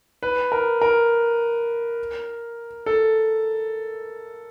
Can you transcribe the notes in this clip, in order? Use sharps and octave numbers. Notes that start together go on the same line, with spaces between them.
B4
A#4
A#4
A4